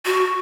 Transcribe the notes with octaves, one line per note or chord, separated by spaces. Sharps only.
F#4